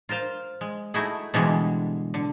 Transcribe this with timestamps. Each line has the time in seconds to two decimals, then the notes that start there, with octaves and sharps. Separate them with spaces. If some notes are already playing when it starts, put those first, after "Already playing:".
0.09 F4 A#4 C5 F5
0.61 G#3
0.94 A3 D#4 E4 F#4 G#4
1.34 B2 D3 E3 G3 G#3 D4
2.14 D3